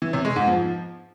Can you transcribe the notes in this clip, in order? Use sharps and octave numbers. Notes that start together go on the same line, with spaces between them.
E3
C3
G#3
G#2
F3